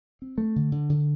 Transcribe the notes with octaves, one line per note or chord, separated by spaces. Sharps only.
C4
A3
D3
D3
D3